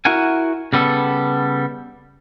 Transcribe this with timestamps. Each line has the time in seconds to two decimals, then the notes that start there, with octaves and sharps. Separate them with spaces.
0.05 E4 F#4 A#4 F#5 G#5
0.73 C#3 G3 B3 A4